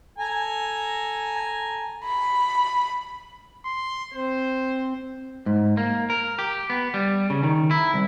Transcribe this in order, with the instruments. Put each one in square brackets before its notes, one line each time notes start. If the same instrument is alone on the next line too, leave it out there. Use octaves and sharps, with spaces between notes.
[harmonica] A4 G#5 A#5
[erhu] B5
[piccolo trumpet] C6
[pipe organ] C4 [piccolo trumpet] C5
[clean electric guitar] G#2
A#3
A#4
G4
B3
G3
C#3
D#3
E4
C2